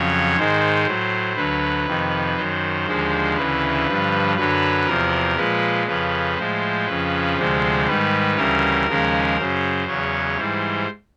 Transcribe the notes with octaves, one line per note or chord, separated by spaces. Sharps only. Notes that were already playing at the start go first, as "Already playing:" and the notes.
Already playing: F2 C#3 F#3 C#5
G#2 D#3 G#3 C5
A2 F#3
D2 D3 F#3 B4
F2 C3 D#3
F#2 D#3 F#3 C5
D#2 D3 F3 G#3
D2 C#3 E3 B4
G2 D3 F3
F#2 D3 F#3 B4
E2 C3 F3 A#4
A#2 F3 G#3 B4
F2 C#3 F3 B4
A2 F3 G#3 C5
F2 C#3 F3 B4
D2 C3 F3 G#3 C5
G#2 D#3 G3 B4
D2 C#3 E3 G3 A#4
D#2 C#3 F3 G#3
F#2 C#3 F#3 C5
E2 C#3 F#3 C#5
G#2 E3 G3 C5